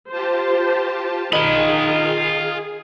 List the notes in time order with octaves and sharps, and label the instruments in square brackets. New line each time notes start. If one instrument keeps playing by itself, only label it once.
[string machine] F4 G4 A5 [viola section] C5
[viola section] D#3 [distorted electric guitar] F4 B5 [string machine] G#4 [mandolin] D#5